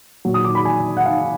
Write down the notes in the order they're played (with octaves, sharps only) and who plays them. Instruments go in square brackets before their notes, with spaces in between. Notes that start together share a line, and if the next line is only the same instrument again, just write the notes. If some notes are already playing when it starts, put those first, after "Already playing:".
[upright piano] A#2 F#3
D#6
D6
B5
G#5
F#5
F5